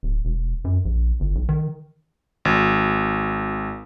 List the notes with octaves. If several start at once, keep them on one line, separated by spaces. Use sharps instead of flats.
D1
E1
F#2
A#1
G1
B1
D#3
G#1